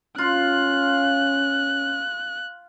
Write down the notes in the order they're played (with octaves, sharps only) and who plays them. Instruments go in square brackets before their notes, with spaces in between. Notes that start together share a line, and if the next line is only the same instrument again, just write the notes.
[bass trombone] C#4 [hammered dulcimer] F4 [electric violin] F#6